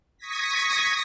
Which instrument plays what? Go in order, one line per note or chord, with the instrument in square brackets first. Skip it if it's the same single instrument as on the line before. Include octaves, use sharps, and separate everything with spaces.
[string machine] C#6 D#6 G#6 A#6 B6